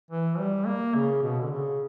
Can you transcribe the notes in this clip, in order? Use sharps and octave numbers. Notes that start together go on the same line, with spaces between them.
E3
G3
A#3
C#3
B2
D3
C#3